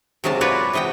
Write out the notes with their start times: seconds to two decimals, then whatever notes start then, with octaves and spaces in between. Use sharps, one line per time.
0.24 C3 F#3 G#3 A#3 A5
0.41 F4 F#4 B4 C#5 D5
0.73 C3 E3 D#5 F#5 G5